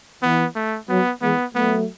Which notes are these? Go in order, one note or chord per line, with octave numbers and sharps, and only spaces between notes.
E3 B3
A3
F#3 B3
E3 G#3 B3
F#3 A3 B3